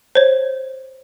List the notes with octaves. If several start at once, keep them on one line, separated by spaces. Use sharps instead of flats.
C5 C#5